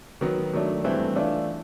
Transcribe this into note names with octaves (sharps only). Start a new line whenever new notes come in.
D#3 F#3 B3
D#3 F#3 A3 D4
G2 E3 A3 C4
E3 A3 D4 F4